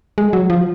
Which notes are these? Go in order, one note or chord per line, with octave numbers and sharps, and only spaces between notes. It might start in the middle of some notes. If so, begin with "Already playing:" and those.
G#3
F#3
F3